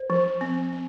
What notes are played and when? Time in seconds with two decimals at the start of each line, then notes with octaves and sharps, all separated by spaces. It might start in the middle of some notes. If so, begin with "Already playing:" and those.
Already playing: C5
0.10 F3
0.41 C4
0.72 C4